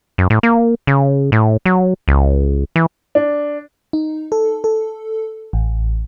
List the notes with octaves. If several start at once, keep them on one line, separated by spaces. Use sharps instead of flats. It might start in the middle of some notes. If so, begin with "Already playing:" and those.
F#2
A2
A#3
C#3
A2
F#3
C#2
E3
D4
D#4
A4
A4
A1